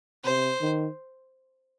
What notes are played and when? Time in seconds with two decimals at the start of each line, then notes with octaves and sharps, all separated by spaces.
0.25 C3 C5
0.61 D#3